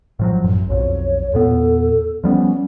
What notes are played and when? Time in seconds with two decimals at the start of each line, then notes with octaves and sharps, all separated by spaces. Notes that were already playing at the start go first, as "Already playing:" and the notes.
0.19 A2 F3 F#3
0.44 A1 F#2
0.70 B1 F2 C#5
1.33 E2 A#2 B3 A4
2.24 F3 G3 B3 C#4